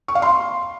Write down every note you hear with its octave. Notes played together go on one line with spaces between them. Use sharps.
C#6
F5
C6